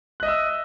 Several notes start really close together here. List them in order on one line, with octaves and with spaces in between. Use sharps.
F#6 D#5 E5 E6